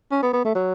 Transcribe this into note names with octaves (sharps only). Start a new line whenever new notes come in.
C#4
B3
B3
A3
F#3